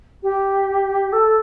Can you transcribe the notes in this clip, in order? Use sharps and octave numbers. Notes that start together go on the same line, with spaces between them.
G4
A4